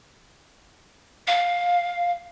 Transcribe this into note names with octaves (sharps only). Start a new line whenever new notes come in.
F5